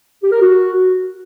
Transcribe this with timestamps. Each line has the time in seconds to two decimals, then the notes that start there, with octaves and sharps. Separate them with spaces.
0.22 G4
0.31 A#4
0.40 F#4